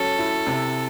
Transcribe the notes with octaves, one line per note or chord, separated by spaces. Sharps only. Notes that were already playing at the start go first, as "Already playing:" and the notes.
Already playing: F#3 C#4 A4
E4
C3